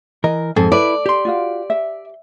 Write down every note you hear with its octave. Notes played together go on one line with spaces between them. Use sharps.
E3 A#4 D#5
F2 G#2 G#4 A4
E4 B4 D5
G4 C6
F4 F#4 F5
E5